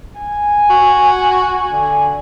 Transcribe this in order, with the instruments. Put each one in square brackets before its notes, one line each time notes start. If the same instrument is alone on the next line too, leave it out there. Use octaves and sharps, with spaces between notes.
[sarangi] G#5
[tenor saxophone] F#4
D3